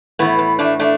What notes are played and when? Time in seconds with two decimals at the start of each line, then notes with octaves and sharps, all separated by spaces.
0.19 A2 E3 B3
0.39 B3
0.59 A3 D4
0.79 A3 D4